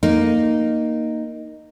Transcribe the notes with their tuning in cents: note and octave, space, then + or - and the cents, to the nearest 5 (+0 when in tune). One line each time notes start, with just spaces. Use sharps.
A#3 +0 D#4 -5